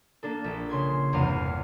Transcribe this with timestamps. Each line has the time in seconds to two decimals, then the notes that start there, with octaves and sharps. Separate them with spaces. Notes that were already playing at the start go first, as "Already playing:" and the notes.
0.23 A#3 D4 A4
0.44 A#1 E5
0.70 C#3 C6 G#6
1.13 G1 E2 C3 B3 F5 D#7